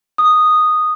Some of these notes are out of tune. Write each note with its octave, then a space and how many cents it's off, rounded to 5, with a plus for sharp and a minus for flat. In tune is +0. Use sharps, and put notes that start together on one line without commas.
D#6 -5